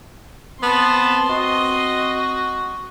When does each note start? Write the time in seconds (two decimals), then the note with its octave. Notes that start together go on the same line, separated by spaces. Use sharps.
0.63 B3 C4 A5 C6
1.29 F#4 D#5